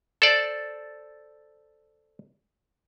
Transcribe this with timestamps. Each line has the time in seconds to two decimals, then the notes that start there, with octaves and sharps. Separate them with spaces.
0.22 A4 C5 D5